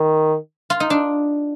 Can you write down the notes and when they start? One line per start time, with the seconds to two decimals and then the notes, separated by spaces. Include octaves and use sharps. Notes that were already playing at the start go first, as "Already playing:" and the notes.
Already playing: D#3
0.70 F4
0.80 D#4
0.90 D4